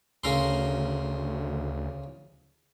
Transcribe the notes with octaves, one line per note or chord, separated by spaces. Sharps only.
D2 C#3 A#4 C6